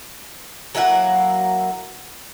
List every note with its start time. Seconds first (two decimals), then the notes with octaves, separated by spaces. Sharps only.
0.75 F#3 A#3 E4 F#5